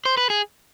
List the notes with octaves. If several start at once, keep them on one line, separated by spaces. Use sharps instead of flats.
C5
B4
G#4